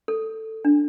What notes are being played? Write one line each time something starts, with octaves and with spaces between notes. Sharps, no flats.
A4
D4